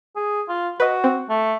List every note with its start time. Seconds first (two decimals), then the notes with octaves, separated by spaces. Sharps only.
0.16 G#4
0.48 F4
0.80 F#4 B4 D#5
1.04 C4
1.29 A3